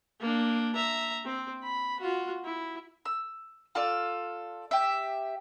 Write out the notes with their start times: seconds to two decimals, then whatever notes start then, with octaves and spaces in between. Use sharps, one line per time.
0.20 A#3 D4
0.75 E5 A#5
1.25 C4
1.64 B5
2.00 F4 F#4
2.45 E4
3.05 E6
3.75 F4 A4 D5
4.71 G4 E5